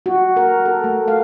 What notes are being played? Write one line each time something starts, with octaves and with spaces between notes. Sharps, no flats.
F#4
A#4
A4
A3
F5